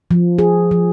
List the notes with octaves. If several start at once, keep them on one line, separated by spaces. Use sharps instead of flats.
F3
G#4
F3